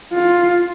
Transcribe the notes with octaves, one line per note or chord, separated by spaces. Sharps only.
F4